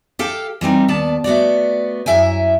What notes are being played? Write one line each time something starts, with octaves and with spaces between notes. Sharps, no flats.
G4 A4 F5 G5
E3 G3 C4 D#4
D#2 B3 D5 A5
A3 B3 F#4 D5
F#2 E4 E5 G5 G#5